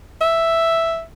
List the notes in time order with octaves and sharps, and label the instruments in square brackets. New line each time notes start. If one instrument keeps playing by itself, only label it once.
[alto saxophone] E5